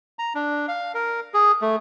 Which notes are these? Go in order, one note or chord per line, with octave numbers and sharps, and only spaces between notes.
A#5
D4
F5
A#4
G#4
A3